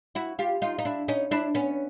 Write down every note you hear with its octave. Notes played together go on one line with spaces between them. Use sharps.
E4 F#4
F4 G4
D#4 F4
D#4
D4 E4
C#4 D#4
D4 E4
B3 C#4